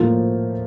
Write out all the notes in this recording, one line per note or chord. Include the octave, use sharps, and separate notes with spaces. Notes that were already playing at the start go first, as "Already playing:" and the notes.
Already playing: A2 F3 A#3 F4 C5